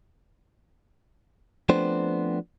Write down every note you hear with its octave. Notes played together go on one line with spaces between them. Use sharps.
F3 A3 B3 C4 D4 C5